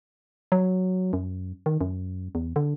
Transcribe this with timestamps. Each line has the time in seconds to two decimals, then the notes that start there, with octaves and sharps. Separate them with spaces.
0.52 F#3
1.13 F#2
1.66 D#3
1.81 F#2
2.35 E2
2.56 D3